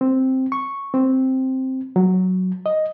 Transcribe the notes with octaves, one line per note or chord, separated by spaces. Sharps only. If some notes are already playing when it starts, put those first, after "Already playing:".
C4
C#6
C4
F#3
D#5